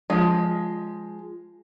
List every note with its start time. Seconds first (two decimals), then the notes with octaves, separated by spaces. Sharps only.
0.10 F3 G#3